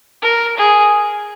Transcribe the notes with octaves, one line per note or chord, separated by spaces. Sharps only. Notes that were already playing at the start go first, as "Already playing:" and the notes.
A#4
G#4